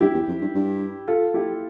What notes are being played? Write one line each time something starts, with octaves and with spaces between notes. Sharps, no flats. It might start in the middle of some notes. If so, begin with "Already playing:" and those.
G2 E4 G4
E2
F2
G2
G2
F4 A4
E4 G4